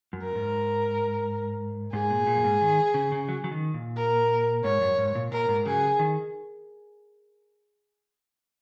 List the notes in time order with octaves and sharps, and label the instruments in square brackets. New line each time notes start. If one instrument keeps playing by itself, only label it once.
[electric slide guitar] F#2
[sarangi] A#4
[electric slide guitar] G#2
[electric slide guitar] G#2 [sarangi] G#4
[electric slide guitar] A#2
A#2
F#2
G#2
D#3
C#3
C#3
F#3
C#3 F#3
D#3
A#2
[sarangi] A#4
[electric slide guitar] G#2 [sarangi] C#5
[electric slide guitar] F#2
G#2
A#2
[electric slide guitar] A#2 [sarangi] A#4
[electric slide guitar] G#2
[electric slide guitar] C#3 F#3 [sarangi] G#4
[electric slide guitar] D#3